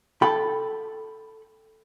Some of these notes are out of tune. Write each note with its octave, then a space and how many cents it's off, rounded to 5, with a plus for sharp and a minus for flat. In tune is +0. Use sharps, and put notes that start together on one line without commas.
A4 +0 G5 +15 B5 +5